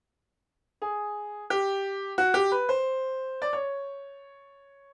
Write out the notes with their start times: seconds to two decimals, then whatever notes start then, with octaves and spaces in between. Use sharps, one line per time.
0.82 G#4
1.50 G4
2.18 F#4
2.34 G4
2.51 B4
2.69 C5
3.42 D5
3.53 C#5